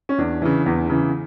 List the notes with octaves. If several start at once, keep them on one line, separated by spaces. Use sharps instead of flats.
C#4
E2 D4
C#3 E3
E2
C#3 E3